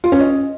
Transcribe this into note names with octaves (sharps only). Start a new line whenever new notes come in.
F4
C#4
D#5